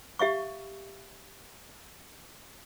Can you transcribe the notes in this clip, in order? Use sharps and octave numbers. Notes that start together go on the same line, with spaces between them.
G4 E5 F5 C#6